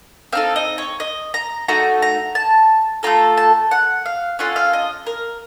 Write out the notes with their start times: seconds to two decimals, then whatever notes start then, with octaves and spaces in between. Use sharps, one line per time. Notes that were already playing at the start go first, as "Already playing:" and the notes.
0.32 C4 D#4 A4 F5
0.56 D#5
0.78 C#5
1.00 D#5
1.34 A#5
1.68 A3 D#4 F#4 A#5
2.02 A#5
2.35 A5
3.03 A3 C#4 F4 A4 A#5
3.37 A5
3.71 F#5
4.06 F5
4.39 C#4 F4 A4 F#5
4.56 F5
4.73 D#5
5.06 A#4